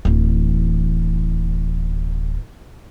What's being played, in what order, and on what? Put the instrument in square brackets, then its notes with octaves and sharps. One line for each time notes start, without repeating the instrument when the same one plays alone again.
[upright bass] D1 E3